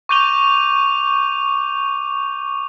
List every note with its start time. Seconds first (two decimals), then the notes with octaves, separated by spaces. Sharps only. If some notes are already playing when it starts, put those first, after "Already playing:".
0.09 C#6 D6 G6 D#7 F7 G7